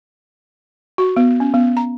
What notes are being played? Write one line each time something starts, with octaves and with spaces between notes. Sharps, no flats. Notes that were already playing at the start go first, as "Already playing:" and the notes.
F#4
B3
C#4
B3
A#5